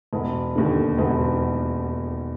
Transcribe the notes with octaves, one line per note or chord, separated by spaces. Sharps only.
E1
D#2 D3
E1